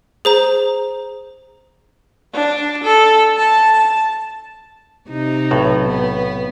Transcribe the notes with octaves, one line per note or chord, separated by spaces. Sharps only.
G#4 C5 A#5
D4
A4
A5
C3 D#4
B1 A2
B3